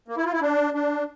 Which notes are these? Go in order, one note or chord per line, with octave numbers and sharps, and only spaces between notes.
A#3
E4
F4
E4
D4
D4